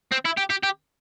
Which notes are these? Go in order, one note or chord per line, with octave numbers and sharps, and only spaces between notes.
C4
E4
G4
G4
G4